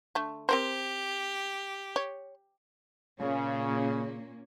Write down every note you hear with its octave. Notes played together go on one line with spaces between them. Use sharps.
D3 A3
C4 G4 A#4 C5
C#5
A#2 C#3 A#3 C#4